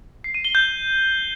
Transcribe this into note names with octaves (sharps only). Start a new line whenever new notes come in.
C7
D#7
G7
G6